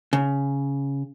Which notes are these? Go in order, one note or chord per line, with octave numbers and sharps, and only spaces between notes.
C#3